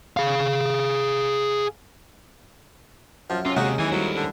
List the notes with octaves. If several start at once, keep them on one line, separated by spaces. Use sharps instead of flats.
G#4 F5
F#2 F3
C3 C#4 F4
D#2 C3 G#3 D#4 F#4 G#4
D#3 E3 F#3 G#5
F#3 G3 E4 A4 C5
D3